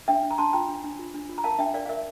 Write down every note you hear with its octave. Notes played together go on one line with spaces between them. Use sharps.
D4 E5 G5
D4
A#5
D4 A5 C6
F4 G5 A#5
D4
D4
F4
D4
F4
A#5
A#4 F5 A5
D4 E5 G5
A#4 D5 F5
F5
A#4 E5